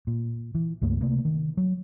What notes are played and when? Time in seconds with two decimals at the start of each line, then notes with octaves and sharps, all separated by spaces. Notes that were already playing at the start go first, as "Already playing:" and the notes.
0.07 A#2
0.55 E3
0.82 C#2 G2 A3 A#3
1.01 C3 A3 A#3
1.25 D#3
1.57 F#3